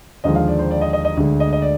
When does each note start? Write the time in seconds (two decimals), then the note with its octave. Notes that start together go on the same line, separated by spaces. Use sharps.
0.24 D#2 D3 F3 G#3 D#5
0.36 F5
0.48 D5
0.59 C5
0.71 D5
0.81 D#5
0.93 D#5
1.05 D#5
1.17 D2 D3 G#3
1.40 D#5
1.53 D#5
1.62 D5